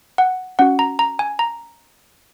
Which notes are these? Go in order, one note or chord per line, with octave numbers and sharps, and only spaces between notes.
F#5
C#4 F#4 F#5
A#5
A#5
G#5
A#5